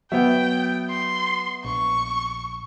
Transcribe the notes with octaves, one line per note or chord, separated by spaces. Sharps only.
F#3 B3 E5 G5
C6
A#1 C#6